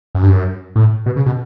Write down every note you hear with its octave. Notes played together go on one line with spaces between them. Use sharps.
F#2
G2
F#2
A2
B2
C#3
B2